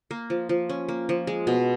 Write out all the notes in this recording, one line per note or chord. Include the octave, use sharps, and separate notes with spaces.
A#3
F3
F3
C#4
A#3
F3
G#3
B2